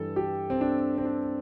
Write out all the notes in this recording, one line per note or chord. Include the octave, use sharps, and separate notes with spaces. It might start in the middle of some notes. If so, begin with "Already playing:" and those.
Already playing: G2 E3 A4
G4
C4
D4
C4
D4